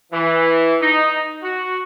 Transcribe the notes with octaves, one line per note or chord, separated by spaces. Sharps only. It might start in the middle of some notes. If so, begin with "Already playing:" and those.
E3
D#4
F#4